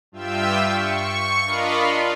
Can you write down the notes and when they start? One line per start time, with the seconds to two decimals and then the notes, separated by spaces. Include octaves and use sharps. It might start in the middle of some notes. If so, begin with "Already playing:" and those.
0.12 G2 F4 E5 G5 E6
0.70 C#6
1.44 D4 F4 A#4 D#5 F5 B5
1.77 F4